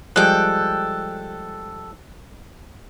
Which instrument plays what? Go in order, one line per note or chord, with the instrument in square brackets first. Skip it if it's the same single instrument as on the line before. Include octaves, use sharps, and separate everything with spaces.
[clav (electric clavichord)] F3 G3 G#3 [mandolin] A4 G5 [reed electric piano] F#6